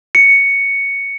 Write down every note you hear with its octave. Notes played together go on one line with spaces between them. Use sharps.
C#7